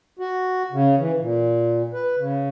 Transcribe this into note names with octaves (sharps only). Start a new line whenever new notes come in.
F#4
C#3
E3
A#2
B4
C#3